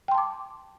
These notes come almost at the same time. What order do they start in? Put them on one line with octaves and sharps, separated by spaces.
G5 C6 A5 D6